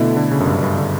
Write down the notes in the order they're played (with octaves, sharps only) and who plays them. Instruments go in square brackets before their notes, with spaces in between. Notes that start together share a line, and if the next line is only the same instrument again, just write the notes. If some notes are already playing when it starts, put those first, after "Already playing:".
Already playing: [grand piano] B2 A3 E4 [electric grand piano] D3
[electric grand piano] D3
C#3
F#2
G2
G2
D3